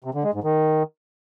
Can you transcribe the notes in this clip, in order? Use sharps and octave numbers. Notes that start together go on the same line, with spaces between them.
C3
D3
G#3
G#2
D#3